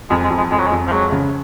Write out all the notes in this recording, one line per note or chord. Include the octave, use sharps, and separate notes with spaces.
F2 G#3
G#3
F2
G#3
F2 G#3
F#3
G#3
F2
F3
F#3 G#3
C#3